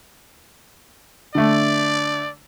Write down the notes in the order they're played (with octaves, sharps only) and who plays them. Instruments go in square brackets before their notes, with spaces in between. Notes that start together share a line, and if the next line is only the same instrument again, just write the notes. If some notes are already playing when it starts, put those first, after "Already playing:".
[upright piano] D3 A3 [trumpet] D5